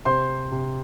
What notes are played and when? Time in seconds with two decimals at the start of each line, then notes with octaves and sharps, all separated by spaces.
0.05 C3 C5 C6
0.51 C3